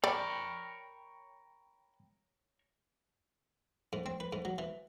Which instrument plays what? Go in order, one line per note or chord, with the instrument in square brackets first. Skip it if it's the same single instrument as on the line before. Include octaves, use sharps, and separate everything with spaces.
[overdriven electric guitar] A#4 C#5 [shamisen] D5 [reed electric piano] G5 B5
[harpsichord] G#2
C4
B4
G#2
F#3
E3